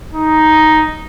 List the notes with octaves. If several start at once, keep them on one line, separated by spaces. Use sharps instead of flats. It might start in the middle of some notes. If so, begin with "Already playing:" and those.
D#4